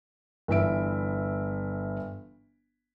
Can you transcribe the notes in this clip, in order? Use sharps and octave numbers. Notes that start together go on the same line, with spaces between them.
G1 E3 E5 D7